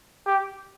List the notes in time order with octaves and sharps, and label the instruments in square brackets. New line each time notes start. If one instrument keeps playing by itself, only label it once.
[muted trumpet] G4